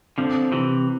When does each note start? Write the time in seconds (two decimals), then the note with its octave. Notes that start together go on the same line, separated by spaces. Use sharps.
0.18 D3 F3 C4
0.52 C3 E3 E4